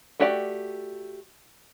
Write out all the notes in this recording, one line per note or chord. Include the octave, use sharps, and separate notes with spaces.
A3 F#4 G4 D5 G5